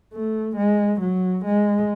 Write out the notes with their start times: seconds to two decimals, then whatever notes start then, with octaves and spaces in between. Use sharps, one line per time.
0.13 A3
0.56 G#3
1.01 F#3
1.45 G#3